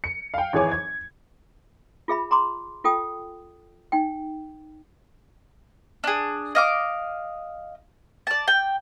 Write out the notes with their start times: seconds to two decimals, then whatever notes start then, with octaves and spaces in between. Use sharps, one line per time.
0.04 C#7
0.34 F5 G5
0.53 G#1 E3 G#4 C#5 G#5 D6
0.71 G#6
2.08 F4 G#4 E5 B5
2.31 A#5 C6 D6
2.84 F4 A4 G5 D#6
3.92 D#4 G5
6.04 D4 G#4
6.55 D#5 F5 D6
8.27 D5 A5
8.48 G5